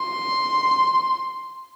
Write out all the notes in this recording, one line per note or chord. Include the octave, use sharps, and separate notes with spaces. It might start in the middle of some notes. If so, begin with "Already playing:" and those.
Already playing: C6